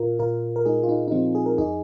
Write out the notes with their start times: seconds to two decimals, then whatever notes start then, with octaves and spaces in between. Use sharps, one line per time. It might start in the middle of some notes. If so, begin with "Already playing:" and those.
Already playing: A#2 F4 A#4
0.19 A#2 F4 A#4
0.56 A#4
0.65 G#3 D#4 G#4
0.83 F4
0.89 D#4
1.08 D#4
1.11 F3 C4 F4
1.35 G#4
1.46 A#4
1.58 F2 D#4 G#4